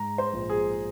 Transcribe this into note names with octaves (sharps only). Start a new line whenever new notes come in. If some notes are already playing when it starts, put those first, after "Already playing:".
Already playing: G#2 A#5
C5
A#1
G#4